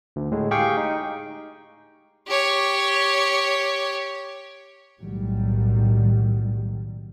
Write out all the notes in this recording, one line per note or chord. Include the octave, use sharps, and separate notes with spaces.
D2
A2 G#3
G4 G#4 F5 G5 C#6
D#4
G4 C#5
B1 A2 D#3 F#3 G3